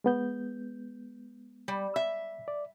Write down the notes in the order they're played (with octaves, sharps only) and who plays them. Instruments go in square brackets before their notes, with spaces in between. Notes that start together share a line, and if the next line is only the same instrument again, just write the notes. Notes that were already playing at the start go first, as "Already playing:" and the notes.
[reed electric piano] G#3 B3 G6
[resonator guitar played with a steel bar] G3
E5
[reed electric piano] D5